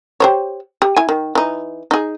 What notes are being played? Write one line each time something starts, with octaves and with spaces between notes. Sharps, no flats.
G4 C5 C#5
G4
E4 G#5
D#3
E3 D#4
D#4 G#4